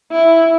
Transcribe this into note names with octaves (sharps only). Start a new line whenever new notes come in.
E4